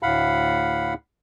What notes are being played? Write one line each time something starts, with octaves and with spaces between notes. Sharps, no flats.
D2 A2 F5 F#5 B5